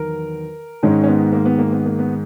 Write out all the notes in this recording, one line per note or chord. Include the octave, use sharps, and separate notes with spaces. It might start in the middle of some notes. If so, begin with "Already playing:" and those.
Already playing: E2 D#3 F#3 A#4
G#2 D#3 G#3 C#4
C#4
B3
A#3
B3
A#3
B3
A#3
B3